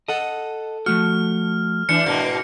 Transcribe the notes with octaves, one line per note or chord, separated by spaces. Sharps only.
A4 D#5 F#5
F3 A3 F#4 F6
E3 D4 C#7
G#2 B2 A#3